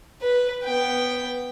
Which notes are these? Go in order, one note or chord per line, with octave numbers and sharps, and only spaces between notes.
B4
B3 G5